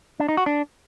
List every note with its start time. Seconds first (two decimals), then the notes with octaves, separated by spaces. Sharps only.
0.20 D4
0.29 D#4
0.37 F#4
0.46 D4